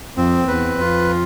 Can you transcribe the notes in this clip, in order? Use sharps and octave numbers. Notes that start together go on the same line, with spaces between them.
F2 C4
E2 B4
F2 F4